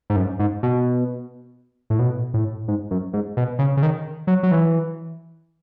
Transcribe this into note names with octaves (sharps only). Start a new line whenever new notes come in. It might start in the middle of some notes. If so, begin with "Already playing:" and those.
G#2
F#2
G#2
B2
A2
B2
A2
G#2
F#2
G#2
B2
C#3
C#3
D#3
F#3
F#3
E3